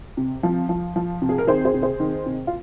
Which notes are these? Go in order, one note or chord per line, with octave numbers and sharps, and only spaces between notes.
C3
F3
F3
F3
C3
G#4
A#4
D#3 G#4 C5
G#4 C5
C3
G#4 C5
D#3
C3
F4